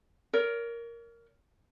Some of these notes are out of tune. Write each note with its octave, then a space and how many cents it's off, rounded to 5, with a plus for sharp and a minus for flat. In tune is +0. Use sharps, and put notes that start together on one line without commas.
A#4 +0 C#5 +40